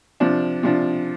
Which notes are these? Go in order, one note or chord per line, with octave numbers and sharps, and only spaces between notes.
C3 F3 D4
C3 F3 D4